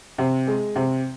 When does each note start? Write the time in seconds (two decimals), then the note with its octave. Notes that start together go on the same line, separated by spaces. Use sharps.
0.18 C3
0.47 G#3
0.76 C3